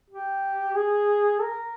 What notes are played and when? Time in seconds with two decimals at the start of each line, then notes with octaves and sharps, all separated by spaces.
0.10 G4
0.76 G#4
1.41 A#4